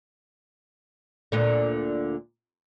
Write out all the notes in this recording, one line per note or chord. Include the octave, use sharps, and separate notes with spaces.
D2 A#2 D3